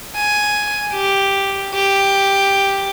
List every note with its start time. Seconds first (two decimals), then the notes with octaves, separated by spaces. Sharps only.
0.16 G#5
0.93 G4
1.74 G4